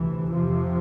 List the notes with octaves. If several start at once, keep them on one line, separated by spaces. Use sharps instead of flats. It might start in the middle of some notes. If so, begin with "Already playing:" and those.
Already playing: D2 C3 E3
F2 C3 F3